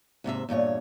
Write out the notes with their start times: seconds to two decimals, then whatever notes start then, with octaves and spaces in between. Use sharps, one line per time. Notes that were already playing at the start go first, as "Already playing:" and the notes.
0.24 D#2 G#2 C3 E5
0.49 E2 G2 A#2 C#5